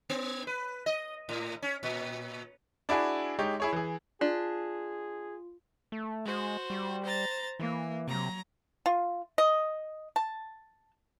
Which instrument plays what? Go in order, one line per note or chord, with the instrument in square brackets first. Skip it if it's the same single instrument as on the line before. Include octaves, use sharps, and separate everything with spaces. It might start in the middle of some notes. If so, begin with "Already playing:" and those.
[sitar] B3
B4
D#5
A2
C#4
A#2
[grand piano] D4 E4 F#4 G#4 G#5
G#3 D#4 G4 C#5
E4 G#4 C#5
E3 G#4
[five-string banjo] D4 [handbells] F4 [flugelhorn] G#4
[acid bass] A3
[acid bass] G#3 [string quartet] F#4 C5
[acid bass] G3
[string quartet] C5 A#5 A6
[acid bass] E3 [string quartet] A#3
[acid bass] C3 [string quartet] F#3 A#5
[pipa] F4
D#5
A5